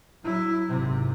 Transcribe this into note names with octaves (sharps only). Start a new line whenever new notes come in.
F#3 E4
G#1 C3